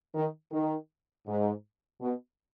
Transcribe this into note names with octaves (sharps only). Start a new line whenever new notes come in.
D#3
D#3
G#2
B2